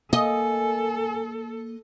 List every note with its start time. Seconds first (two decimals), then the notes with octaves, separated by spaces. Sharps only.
0.13 A#3 A4 D#5 G#5